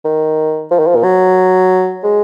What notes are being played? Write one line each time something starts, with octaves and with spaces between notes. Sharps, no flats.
D#3
F3
D#3
F3
A#2
F#3
G#3